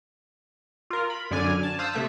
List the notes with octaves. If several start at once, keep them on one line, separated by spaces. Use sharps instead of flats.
F4 A#4
B5
F#2 D3 D5 G#5 F6
A5
C5 F5 A5 D#6 E6 F#6
C3 A3 E5 B6